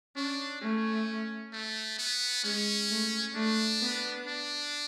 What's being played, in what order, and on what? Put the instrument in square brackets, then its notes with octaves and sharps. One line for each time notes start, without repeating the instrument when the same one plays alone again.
[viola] C#4 [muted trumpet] D4
[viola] A3 [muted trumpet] C#4
[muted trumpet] A3
B3
[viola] G#3 [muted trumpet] C#4
[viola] A3
[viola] A3 [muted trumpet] D4
[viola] B3
[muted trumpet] D4